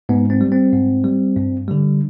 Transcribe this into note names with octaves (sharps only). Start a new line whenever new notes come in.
G#2 B3
C4
G3
C4
G#2
G3
G2
D3 G3